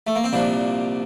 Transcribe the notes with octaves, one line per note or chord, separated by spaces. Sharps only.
A3
A#3
C4
C2 A#2 F3 D4